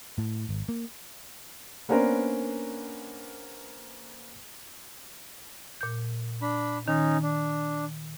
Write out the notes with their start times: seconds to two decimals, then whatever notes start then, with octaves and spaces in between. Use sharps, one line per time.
0.18 A2
0.49 G#1
0.69 A#3
1.89 A#3 B3 C#4 D4 A#4 C5
5.81 A#2 G6
6.42 D4 B5
6.88 D#3 C#4 D#4
7.23 D4